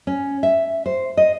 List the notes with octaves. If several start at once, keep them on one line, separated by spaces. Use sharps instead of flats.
C#4
E5
C5
D#5